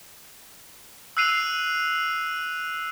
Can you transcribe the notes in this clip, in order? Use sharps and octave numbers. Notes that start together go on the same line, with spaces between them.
E6 F#6 C7 D#7 F7